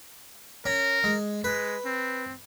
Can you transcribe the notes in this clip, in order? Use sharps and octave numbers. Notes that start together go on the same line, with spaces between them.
C#4 A#4
G#3
G#3 B4
C4